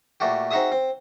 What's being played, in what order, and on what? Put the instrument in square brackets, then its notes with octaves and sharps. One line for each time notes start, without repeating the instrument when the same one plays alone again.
[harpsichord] A#2 A3 F#4 G4
C4 D#4 F#4 G#4 E5 D#6
C4